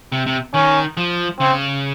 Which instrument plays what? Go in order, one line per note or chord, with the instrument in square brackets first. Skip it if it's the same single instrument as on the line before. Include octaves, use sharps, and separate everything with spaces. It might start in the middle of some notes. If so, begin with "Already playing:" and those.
[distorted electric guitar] C3
C3
[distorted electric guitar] D#3 [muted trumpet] C#4
[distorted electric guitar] F3
[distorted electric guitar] C#3 [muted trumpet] C4